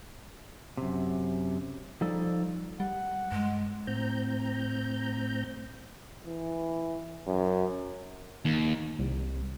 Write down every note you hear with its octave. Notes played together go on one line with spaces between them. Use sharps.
F#2 C3
F3 G3 D#4 A4 D5
G3 F#5
G2 G#3
A2 C4 A#5 G6
E3
F#2
D#2
C2